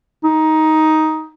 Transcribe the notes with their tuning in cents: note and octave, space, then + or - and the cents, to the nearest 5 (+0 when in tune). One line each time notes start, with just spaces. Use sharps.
D#4 +10